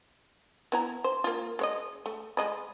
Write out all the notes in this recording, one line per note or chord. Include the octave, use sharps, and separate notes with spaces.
B3 E4 A#5
C5
A#3 F4
G#3 C#5 D#5
A3
G#3 D#5 B5